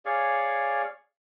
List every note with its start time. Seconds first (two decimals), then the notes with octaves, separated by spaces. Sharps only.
0.05 G#4 C#5 D5 F5